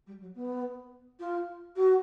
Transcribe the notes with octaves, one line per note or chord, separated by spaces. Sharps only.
G3
F#3
B3
F4
F#4